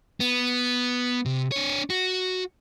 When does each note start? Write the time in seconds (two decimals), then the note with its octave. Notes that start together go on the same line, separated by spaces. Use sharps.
0.20 B3
1.26 C3
1.52 D4 C#5
1.90 F#4